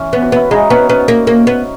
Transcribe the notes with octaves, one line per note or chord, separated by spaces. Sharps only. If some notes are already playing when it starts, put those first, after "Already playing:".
Already playing: E3 C#4
B3
F#4
B3 E4
G#3 D#4
B3 C#4
B3 C#4
A#3
A#3
B3